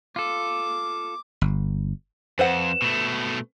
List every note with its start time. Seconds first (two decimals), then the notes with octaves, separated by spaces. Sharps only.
0.16 F4 A4 D6
1.41 G1
2.39 F2 B4 C5 F#5 E7
2.82 B2 A3